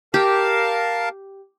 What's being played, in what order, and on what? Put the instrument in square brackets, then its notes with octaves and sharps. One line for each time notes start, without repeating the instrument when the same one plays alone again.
[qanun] G4 [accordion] A#4 F5 A5